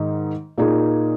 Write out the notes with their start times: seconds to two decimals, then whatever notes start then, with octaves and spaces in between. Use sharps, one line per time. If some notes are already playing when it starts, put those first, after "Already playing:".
Already playing: G#2 D#3 D#4
0.58 A#2 A#3 D#4 G#4